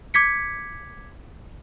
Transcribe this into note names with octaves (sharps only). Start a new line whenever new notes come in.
D6 G#6 B6 C#7